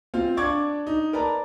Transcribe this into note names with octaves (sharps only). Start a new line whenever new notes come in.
C4 F4 F5
D4 D5 C#6 D6 G#6
D#4
A#4 B4 D5 A5 A#5